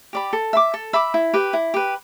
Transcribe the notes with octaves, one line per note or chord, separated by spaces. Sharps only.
G4 D5 B5
A4
E5 B5 D6
A4
E5 B5 D6
E4
G4 B4
E4
G4 B4